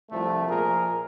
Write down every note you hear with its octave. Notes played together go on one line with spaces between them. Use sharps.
C2 F3 A3
A#2 F3 G#4 A#4